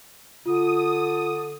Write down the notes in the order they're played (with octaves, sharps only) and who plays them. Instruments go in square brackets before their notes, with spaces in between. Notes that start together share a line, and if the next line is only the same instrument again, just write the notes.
[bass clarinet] D3 [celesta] F4 [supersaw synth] D#6